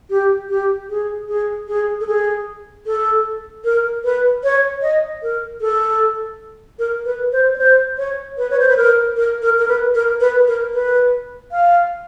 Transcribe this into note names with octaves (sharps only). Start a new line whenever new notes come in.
G4
G4
G#4
G#4
G#4
A4
G#4
A4
A#4
B4
C#5
D#5
A#4
A4
A#4
B4
C5
C#5
C5
C#5
B4
C#5
C5
B4
A#4
A#4
A#4
A#4
B4
A#4
B4
A#4
B4
F5